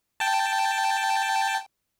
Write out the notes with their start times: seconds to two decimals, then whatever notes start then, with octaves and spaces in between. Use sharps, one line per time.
0.20 G5 A5